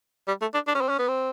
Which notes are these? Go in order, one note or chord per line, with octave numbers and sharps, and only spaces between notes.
G3
A3
D4
D4
C#4
C4
C#4
B3
C4